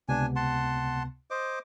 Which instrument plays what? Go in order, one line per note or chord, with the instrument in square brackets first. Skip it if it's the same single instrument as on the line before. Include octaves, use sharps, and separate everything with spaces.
[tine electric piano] C#2 C3 B3 [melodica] D4 G#5
[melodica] F#5 A5 C6
C5 D#5 D6